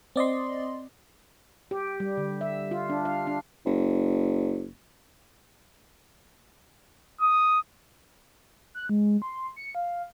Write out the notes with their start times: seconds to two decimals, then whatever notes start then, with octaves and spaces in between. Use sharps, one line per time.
0.16 C4 D5 D#5 C6
1.71 G4
2.00 G3
2.17 D3
2.41 E5
2.71 F4
2.90 D4
3.05 F5
3.27 D4
3.65 F#1
7.21 D#6
8.75 F#6
8.89 G#3
9.22 C6
9.56 C#7
9.75 F5